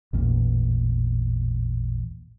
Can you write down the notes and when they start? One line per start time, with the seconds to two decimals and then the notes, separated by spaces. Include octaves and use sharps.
0.13 A1 E2 A#2